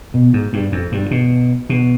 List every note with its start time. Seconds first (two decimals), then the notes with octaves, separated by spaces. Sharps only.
0.14 B2
0.33 G#2
0.53 G2
0.72 F2
0.92 G2
1.11 B2
1.70 B2